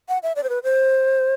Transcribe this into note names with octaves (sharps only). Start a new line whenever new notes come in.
F#5
E5
D5
C5
B4
C5